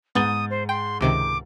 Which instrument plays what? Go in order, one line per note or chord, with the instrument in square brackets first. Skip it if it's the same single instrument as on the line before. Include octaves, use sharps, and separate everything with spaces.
[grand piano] G#2 A6 G7 [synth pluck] B3 [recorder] D#6
[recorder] C5
[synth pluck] G5 [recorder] C6
[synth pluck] C#2 C3 D#3 [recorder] D6